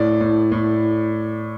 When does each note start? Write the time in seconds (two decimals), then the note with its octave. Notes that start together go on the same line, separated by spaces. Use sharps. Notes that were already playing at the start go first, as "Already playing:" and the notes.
Already playing: A2 D5
0.21 A2
0.52 A2